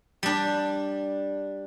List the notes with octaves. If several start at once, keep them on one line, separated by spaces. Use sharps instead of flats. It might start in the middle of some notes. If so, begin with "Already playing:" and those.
G3 D4